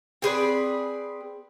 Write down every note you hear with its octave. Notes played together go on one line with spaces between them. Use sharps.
C4 G#4 B4 D5